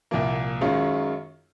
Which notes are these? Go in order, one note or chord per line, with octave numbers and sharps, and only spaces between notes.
C2 A#2 F3 A#3
F#2 D#3 G#3 C#4 F4